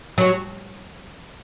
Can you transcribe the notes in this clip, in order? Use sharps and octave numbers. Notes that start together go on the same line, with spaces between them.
F#3